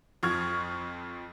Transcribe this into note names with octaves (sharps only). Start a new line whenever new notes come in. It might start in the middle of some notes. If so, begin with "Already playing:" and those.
F2 F3 C#6 F6 G#6